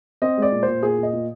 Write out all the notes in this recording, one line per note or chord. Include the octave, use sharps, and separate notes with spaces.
C4 D#5
G#3 D5
A#2
A#2 C5
A#2 G#4
A#2 D#5
A#2